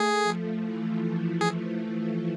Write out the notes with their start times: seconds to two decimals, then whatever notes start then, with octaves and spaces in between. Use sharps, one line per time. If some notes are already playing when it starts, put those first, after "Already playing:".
Already playing: A3 G#4
0.23 F3
0.62 E3
1.41 G#4